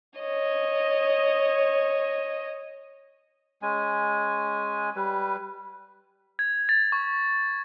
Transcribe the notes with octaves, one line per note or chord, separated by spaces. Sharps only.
C#5 D#5
G#3 C#4 G#5
G3 B4
G#6
A6
C#6